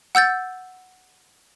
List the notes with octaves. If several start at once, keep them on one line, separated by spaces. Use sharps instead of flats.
F#5 E6 G6 A6